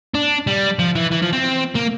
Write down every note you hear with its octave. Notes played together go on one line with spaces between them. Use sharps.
D4
G3
F3
E3
E3
F3
C4
A#3